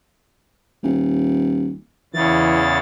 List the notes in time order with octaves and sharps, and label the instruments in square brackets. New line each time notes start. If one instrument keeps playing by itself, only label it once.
[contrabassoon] D#1
[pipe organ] E2 C#3 A6 [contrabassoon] E3